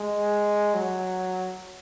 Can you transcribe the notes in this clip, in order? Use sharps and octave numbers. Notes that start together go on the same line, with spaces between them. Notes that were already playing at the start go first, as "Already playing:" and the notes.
Already playing: G#3
F#3